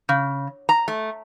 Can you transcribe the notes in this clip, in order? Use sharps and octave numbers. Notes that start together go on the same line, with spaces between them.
C#3
A#5
A3